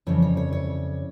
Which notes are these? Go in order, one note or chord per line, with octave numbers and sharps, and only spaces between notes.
F2 C#3 E3 G3 C#5
C#5
C#5
C#5